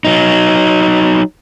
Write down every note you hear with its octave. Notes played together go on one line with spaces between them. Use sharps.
F#3 D#4